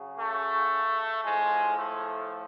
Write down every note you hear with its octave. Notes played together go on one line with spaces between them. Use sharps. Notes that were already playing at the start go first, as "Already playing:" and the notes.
Already playing: C#3 F#3
A3
A2 F3 G#3
A3